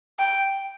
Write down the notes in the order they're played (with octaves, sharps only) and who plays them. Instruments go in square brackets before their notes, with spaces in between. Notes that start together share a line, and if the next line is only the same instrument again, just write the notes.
[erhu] G5